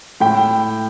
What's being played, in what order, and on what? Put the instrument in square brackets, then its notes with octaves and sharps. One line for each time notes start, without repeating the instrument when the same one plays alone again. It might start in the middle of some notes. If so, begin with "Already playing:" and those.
[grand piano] A2 G5